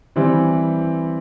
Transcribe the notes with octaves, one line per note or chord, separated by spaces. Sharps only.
E3 G3 C4 E4